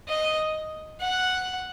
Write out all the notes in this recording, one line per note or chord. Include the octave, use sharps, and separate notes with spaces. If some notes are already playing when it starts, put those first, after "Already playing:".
D#5
F#5